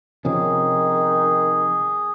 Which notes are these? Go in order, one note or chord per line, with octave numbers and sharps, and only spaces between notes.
C3 D#3 F3 C#4 G#4